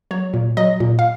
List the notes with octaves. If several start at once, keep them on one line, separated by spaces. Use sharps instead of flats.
F#3 C#5
A#2
F#3 D#5
A#2
F5